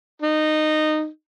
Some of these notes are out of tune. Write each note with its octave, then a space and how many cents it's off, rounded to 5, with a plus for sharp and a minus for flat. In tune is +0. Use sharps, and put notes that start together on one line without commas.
D#4 -15